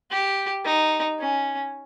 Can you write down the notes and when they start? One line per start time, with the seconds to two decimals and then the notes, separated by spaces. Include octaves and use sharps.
0.11 G4
0.65 D#4
1.19 C#4